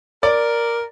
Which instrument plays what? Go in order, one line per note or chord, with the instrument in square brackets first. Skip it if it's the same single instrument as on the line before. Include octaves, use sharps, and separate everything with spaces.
[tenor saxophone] A#4 [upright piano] D5